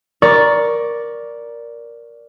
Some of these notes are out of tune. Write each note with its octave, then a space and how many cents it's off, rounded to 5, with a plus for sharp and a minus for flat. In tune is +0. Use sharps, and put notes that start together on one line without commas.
A#4 +10 D5 -5 C#6 +0